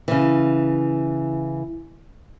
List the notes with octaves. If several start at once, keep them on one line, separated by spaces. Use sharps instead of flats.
C#3 E3